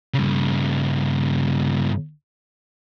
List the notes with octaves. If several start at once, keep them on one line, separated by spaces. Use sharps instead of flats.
G2 C#3